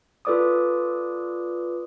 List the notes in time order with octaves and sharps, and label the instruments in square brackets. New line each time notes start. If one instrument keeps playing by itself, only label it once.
[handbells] F4 A4 B4 D5 D6 D#6